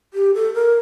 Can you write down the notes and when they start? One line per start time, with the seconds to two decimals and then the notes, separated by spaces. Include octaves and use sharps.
0.14 G4
0.34 A4
0.54 A#4